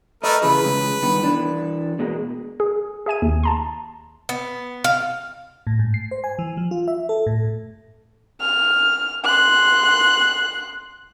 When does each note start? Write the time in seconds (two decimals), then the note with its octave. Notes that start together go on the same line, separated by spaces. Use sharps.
0.24 A3 A#4 B4 D#5
0.42 C#3 E3 G#4 B4
0.64 C#3 G#3
1.03 G2 D#3 B3
1.22 E3 D4
1.99 B2 G#3 A#3
2.60 G#4
3.06 G#4 E5 G#5 D#7
3.22 D#2
3.43 A5 A#5 C6
4.29 B3
4.84 F5
5.67 A2
5.79 G#2
5.94 C7
6.11 C5
6.24 G#5
6.39 E3
6.57 F3
6.71 F4
6.88 E5
7.09 A4
7.27 A2
8.42 F6
9.25 C6 F#6